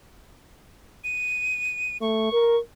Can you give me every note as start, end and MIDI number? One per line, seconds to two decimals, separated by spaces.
1.04 1.97 99
2.01 2.30 57
2.01 2.59 85
2.33 2.58 70